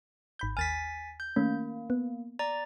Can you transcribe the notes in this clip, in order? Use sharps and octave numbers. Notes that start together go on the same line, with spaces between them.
G#1 B5 G6
D#2 G#5 F6 A6 B6
G6
D#3 A3 A#3 C#4
B3
D5 A#5 A6